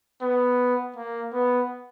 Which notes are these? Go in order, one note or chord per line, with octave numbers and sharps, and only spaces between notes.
B3
A#3
B3